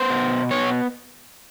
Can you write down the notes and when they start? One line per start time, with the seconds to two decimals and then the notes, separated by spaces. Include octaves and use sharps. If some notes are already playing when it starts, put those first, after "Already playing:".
Already playing: B3 C5
0.10 B2
0.51 B3 C#5